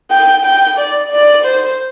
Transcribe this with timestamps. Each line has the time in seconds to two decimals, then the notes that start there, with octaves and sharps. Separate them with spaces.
0.11 G5
0.45 G5
0.78 D5
1.11 D5
1.45 C5